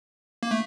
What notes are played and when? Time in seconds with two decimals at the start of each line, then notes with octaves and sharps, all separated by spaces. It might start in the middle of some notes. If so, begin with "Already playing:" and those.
0.43 A#3
0.51 A3